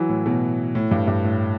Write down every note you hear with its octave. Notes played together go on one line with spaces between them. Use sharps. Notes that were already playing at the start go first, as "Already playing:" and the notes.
Already playing: E3 F#3
A2
B2
A2
G2
G2
A2